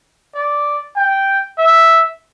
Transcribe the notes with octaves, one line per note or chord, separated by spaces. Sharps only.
D5
G5
E5